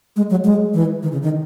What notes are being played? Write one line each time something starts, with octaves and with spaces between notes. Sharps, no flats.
G#3
F#3
G#3
E3
D#3
C#3
D#3